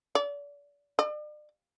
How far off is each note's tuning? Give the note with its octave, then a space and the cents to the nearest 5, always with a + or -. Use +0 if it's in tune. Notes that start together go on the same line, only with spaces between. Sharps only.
D5 -35
D5 +40